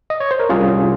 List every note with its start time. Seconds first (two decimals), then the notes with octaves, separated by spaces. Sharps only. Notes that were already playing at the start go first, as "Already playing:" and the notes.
0.10 D#5
0.20 C#5
0.31 C5
0.40 A#4
0.49 C2 C3 G3 C#4 F4 G#4